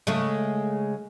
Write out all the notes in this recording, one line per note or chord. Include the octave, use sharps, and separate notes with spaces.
C#3 G#3 A3